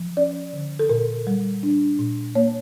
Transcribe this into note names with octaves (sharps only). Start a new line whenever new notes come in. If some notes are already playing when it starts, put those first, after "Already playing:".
Already playing: F3
C#4 D5
D3
A4
A#2 A#4
G3
D4
A#2
A#3 C#5